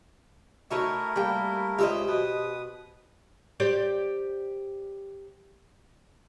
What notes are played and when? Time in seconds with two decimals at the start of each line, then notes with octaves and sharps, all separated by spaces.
0.71 A3 D#4 E4 F#4 A#4 C#5 E5
1.16 G3 A#3 G5
1.78 C#2 G4 B4 C5 D#5 E5
2.08 B2 B4 D#6
3.60 G4 C5 D5